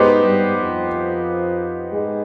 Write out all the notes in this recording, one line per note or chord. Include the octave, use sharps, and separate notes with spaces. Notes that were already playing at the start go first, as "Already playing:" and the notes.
Already playing: G#2 G#3 B3 D#4 G4 C5
G2 G3
F2 F3
G#2 G#3